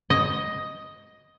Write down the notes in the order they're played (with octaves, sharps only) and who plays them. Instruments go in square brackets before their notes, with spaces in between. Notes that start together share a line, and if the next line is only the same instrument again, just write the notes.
[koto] D#5